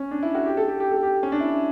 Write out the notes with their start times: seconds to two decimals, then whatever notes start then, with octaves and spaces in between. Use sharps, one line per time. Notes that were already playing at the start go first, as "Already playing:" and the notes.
Already playing: C#4
0.11 D4
0.23 E4
0.35 F#4
0.46 G4
0.57 A4
0.68 G4
0.80 G4
0.91 A4
1.03 G4
1.23 C#4
1.32 D4
1.40 E4